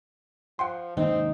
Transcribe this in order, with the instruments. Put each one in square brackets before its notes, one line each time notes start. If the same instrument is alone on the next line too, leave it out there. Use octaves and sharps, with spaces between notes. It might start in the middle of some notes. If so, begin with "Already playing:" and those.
[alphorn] F3 [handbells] F#5 G5 C6
[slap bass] D#3 G#3 A#3 [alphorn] C4 [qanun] D#4